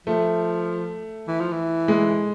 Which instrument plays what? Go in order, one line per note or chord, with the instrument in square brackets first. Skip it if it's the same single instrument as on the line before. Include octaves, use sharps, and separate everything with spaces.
[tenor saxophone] F3 [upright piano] A3
[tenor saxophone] E3
F3
E3
[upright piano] G#3